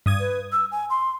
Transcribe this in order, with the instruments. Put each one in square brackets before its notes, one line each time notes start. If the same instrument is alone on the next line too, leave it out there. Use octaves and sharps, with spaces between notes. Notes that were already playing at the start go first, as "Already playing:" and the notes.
[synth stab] G2 D#6 G#6
[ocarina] B4
E6
G#5
C6